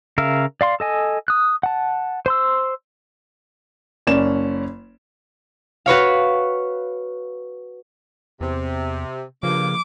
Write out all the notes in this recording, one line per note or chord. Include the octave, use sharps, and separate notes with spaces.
C#3 A#4 E5 F5
D5 F5 C6
A4 D#5 G#5
D#6 F#6
F#5 A5
C5 C6 E6
F#1 C#4 D5 E7
F#4 B4 C#5 F5
E2 C3
G2 C#3 F3 A#3 D6